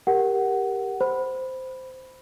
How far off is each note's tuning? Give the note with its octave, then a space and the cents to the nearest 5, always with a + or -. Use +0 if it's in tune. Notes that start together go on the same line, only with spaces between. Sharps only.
G4 +5 A#4 +0 F#5 +15
C5 -10 B5 +0